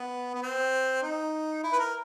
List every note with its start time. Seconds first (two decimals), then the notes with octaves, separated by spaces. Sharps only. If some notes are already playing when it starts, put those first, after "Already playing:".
Already playing: B3
0.35 B3
0.42 C4
1.03 D#4
1.63 E4
1.73 B4
1.79 A#4